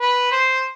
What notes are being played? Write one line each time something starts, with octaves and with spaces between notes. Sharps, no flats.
B4
C5